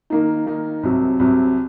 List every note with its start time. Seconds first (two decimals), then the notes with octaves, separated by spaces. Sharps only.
0.10 D#3 A#3 D#4
0.46 D#3 A#3 D#4
0.83 C2 C3 F#3
1.19 C2 C3 F#3